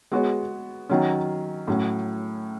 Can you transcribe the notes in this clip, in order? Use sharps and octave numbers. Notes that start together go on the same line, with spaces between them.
G#3 B3 F#4 C#5
D#3 F#3 C#4
A2 F#3 C#4